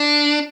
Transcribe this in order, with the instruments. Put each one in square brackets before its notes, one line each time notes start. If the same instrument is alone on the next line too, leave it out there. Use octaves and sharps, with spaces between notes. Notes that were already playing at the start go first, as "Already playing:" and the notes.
Already playing: [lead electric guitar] D4